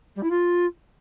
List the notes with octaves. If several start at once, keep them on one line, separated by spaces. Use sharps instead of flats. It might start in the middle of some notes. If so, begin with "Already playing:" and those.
G3
E4
F4